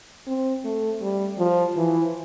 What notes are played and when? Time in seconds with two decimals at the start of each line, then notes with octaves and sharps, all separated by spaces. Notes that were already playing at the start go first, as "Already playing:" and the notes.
0.27 C4
0.65 A3
1.02 G3
1.39 F3
1.77 E3